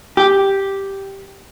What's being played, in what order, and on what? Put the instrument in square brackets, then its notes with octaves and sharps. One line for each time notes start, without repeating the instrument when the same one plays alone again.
[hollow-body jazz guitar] G4